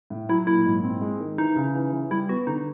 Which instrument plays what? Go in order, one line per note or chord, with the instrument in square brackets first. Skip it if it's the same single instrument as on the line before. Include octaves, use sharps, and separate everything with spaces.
[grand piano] A2
[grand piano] F#3 [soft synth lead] E4
[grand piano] A#2 [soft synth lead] E4
[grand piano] G#2
C4
G#3
D#3
[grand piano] E3 [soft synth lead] D#4
[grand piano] C#3
E3
E3
[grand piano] G3 [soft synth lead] E4
[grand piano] B3 [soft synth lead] F#4
[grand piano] D3 [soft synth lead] D#4